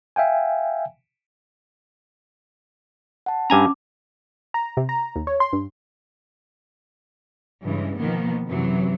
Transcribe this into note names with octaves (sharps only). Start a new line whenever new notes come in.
E5 F5 G5 G#5
F#5 A5
G2 C#4 G#5 A#5 D6
A#5
C3
A#5
D#2
C#5
C6
G2
G2 C#3 E3 G#3
B2 D#3 F3 A#3 B3
F#2 C3 E3 F#3